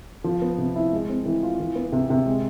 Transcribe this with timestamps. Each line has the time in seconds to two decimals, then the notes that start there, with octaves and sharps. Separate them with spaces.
0.24 F3
0.42 B3
0.58 C3
0.76 E4
0.92 G#3
1.09 C4
1.25 E3
1.43 F4
1.60 E3
1.75 B3
1.92 C3
2.10 C3
2.26 G#3